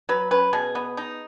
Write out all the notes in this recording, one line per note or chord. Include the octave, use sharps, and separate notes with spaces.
F#3 B4
C#4 B4
B2 G#4
B3
D#4